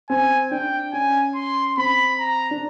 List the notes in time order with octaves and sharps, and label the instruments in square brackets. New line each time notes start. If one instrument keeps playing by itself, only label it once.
[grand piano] C4 [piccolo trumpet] G#5
[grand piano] D4 [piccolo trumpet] G5
[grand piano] C#4 [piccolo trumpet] G#5
[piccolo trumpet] C6
[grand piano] C4 [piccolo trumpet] B5
[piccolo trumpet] A#5
[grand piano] D4